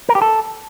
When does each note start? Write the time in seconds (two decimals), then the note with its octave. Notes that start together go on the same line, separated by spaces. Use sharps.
0.09 A#4
0.15 G4
0.22 A4